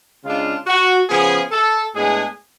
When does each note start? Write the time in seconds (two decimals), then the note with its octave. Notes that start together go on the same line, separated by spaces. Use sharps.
0.24 C#3 G#3 D4 F4
0.67 F#4
1.08 C#3 F3 B3 G#4
1.51 A4
1.93 A2 G#3 B3 D4 G#4